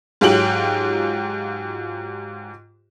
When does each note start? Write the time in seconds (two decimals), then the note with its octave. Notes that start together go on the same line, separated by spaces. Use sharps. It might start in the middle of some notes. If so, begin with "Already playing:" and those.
0.21 G#2 F#3 F4 G4 G5 F#7